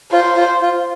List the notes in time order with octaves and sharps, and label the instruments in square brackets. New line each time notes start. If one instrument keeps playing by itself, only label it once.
[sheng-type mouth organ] F4 [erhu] C5
[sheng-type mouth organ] F4
F4